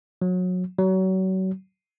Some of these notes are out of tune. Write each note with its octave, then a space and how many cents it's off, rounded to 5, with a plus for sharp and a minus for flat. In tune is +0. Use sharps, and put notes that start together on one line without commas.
F#3 -25
F#3 +30